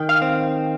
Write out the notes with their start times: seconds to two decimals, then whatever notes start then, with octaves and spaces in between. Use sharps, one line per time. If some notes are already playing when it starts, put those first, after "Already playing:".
Already playing: D#3 G5
0.09 F5
0.22 C4